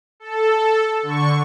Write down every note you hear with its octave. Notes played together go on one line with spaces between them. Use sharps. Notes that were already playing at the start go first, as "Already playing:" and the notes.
A4
D3 C#6